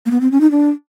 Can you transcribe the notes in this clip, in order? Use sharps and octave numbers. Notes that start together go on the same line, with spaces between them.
A#3
B3
C4
C#4
D#4
D4